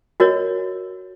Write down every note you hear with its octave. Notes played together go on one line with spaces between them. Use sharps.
F#4 A#4 C#5 D#5